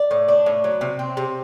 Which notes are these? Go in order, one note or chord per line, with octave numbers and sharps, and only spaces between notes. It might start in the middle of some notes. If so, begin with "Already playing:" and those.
Already playing: D5
A2
D4
A2
F#3
C3
C4
C3